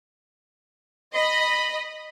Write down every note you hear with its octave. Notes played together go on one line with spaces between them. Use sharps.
D#5 B5